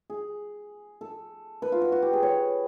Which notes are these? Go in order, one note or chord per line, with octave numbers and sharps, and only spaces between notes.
G#4
A4
B4
F4
F#4
F#4
G4
G#4
C#5